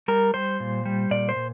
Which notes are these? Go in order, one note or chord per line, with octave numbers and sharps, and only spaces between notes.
G3 A#4
G3 C5
A#2
G3
A#2 D5
C5
A#2